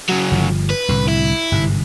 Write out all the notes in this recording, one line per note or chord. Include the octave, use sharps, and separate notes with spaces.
C#3 F#3
G1 F3
B4
C2 A2 D3
E4
G1 G#2 C3